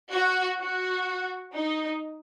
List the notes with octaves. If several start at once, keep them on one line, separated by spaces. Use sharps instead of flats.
F#4
F#4
D#4